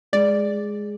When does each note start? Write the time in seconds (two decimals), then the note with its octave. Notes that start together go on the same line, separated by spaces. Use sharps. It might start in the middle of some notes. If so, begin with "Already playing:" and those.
0.13 G#3 D5